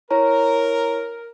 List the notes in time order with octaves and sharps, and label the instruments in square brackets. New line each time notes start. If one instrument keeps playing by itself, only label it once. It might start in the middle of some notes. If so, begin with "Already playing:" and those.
[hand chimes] E4 C#5 A#5 [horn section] A#4